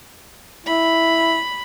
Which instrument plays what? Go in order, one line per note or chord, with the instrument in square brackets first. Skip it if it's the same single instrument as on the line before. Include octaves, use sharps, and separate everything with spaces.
[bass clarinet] E4 [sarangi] B5